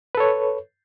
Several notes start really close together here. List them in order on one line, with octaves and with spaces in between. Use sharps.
B4 A4 C#5